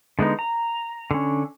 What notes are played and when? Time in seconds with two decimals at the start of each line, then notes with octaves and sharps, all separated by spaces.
0.19 D3 G#3 B3 D#4
0.39 A#5
1.11 D3 C#4